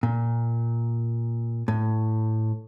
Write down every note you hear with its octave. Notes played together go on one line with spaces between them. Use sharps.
A#2
A2